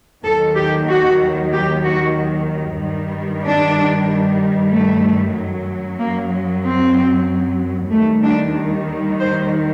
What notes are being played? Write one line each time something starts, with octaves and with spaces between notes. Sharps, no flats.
D#2 D#3 F#3 A4
G4
F#4
G4
F#4
G2 D#3 G3
D4
A3
F#2 F#3
A#3
C4
D#2 D#3 G3 A3
D4
C5